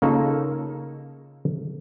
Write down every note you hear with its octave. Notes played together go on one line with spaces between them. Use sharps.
C#3 A#3 D#4 F4 A4